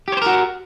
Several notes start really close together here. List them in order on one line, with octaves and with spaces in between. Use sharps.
G4 C#5 C5 A#4 F#4